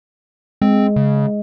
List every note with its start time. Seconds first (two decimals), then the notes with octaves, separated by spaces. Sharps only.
0.62 G#3 C4
0.96 C#3